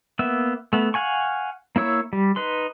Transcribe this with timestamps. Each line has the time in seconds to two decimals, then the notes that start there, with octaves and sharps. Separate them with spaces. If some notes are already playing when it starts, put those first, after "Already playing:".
0.19 A#3 B3 E5
0.73 A3 B3
0.94 F5 F#5 G#5 C#6
1.76 A#3 E4 C#5 E6
2.13 G3
2.36 D#4 B4 C6